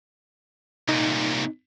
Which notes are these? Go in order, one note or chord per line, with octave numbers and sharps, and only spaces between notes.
C2 A#2 D#4